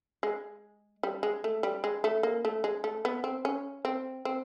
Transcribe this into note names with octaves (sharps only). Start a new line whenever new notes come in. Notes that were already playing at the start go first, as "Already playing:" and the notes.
G#3
G3
G#3
A3
G3
G#3
A3
A#3
A3
G#3
A3
B3
C4
C#4
C4
C4